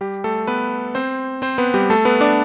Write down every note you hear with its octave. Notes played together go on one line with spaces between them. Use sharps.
G3 G4
A3 A4
B3 B4
C4 C5
C4 C5
B3 B4
G3 G4
A3 A4
B3 B4
D4 D5